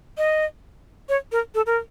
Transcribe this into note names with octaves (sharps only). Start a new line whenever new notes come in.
D#5
C#5
A#4
A4
A#4